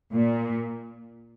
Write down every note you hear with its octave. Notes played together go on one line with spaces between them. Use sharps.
A#2